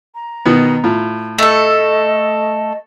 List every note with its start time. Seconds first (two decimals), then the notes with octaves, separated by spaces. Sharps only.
0.15 A#5
0.46 B2 D#3 B3
0.84 A2 F4
1.38 A3 A4 D#5